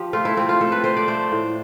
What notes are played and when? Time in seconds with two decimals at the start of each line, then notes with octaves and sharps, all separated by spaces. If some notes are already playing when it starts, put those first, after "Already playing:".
Already playing: F3 G4
0.13 A3 F4
0.25 E4
0.37 A3 C4
0.49 F4
0.61 A3 A4
0.72 B4
0.84 A3 C5
0.97 D5
1.08 A3 C5
1.32 A2